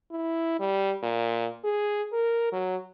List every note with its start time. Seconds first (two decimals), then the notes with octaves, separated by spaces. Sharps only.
0.11 E4
0.60 G3
1.03 A#2
1.64 G#4
2.13 A#4
2.53 F#3